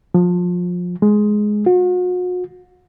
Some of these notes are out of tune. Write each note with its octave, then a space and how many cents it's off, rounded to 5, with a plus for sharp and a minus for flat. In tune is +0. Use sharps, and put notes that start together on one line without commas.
F3 +25
G#3 +10
F#4 -40